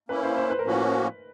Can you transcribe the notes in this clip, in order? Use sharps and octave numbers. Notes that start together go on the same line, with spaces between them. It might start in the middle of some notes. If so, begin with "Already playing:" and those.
A#3 C#4 E4 B4
C5
C5
B4
A#4
A2 F3 A#3 C#4 F#4 B4